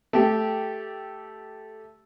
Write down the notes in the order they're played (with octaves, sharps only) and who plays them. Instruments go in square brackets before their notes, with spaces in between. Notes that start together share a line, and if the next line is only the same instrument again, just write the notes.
[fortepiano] A3 G4